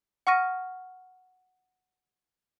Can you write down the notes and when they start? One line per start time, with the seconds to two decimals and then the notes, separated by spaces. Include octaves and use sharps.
0.27 F#5 C#6 F6 A#6 D#7